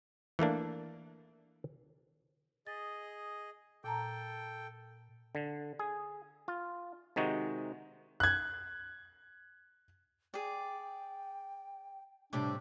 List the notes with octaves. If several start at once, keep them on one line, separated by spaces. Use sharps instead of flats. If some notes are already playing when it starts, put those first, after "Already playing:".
E3 A3 A#3 D4
G#4 D#5 A6
A#2 A4 G5 A5 A#5
D3
G#4
F4
C3 D#3 G#3 D#4 F#4
F#6 G#6
G#4 D5 G5
A2 C3 G3 D4 D6